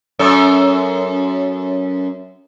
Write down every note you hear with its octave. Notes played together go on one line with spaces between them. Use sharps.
F#2 C#4 A4